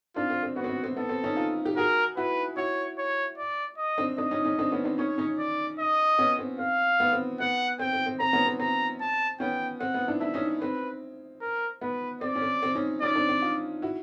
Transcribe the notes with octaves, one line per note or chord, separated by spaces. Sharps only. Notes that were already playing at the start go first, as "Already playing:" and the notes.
C4 D4 F4
C4
C4
B3 F#4
C4
B3
C4
B3 A4
C4
C#4 D#4
D#4 F4
G4
F#4 G#4 A#4
E4 F#4 B4
E4 F#4 C#5
C#5
D5
D#5
C4 D4
C4 D4 D#5
C#4 D#4
C#4 D#4
C4 D4
B3 C#4
C4 D4
C#4 D#4 C#5
C#4 D#4
D5
D#5
B3 C#4
C4
C4 F5
B3
C4
B3 F#5
C4 G5
C4
C4
C4 A#5
B3 C#4
C4
C4 A#5
A5
B3 C#4 G5
C4 F#5
B3
D4 E4
D4 E4 E5
C#4 D#4
C4 B4
A#4
B3 B4
C4 D5
C#4
C4
C4
C#4 D#4
C#4 D#4 D5
C4 D4
C4
D#4 F4
E4 F#4